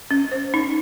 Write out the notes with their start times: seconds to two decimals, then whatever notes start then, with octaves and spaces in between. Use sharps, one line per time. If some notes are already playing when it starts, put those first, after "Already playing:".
0.11 C#4
0.32 C5
0.54 D#4